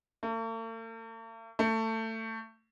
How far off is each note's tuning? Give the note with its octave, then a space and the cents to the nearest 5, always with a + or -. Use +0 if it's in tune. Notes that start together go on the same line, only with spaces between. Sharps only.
A3 +45
A3 +20